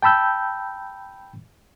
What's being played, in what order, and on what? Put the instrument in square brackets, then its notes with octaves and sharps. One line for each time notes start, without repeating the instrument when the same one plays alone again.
[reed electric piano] G5 A5 B5 E6 G6